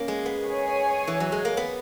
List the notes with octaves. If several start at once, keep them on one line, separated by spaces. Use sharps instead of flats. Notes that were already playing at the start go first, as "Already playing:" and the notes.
Already playing: A#3 C#4
G#3
B3
G#4 C#5 G#5
E3
F#3
G#3
A#3
B3